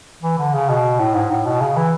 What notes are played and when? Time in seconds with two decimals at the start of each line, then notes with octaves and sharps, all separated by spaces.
0.23 E3
0.39 D3
0.54 C#3
0.70 B2
1.00 A2
1.15 G#2
1.31 A2
1.46 B2
1.61 C#3
1.77 E3